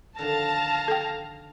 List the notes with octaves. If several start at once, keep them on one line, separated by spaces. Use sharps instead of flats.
D3 D#3 F3 F5 A5 A#5
A4 G5